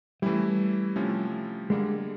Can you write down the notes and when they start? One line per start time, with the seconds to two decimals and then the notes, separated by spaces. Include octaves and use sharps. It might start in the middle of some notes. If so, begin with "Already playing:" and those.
0.22 E3 G3 A3 C#4 E4
0.96 C3 F3 A3 C#4 E4
1.70 D3 G3 G#3 A#3